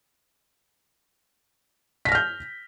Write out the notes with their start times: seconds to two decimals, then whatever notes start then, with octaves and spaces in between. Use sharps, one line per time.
2.05 B6
2.09 A#6
2.12 F6
2.15 G6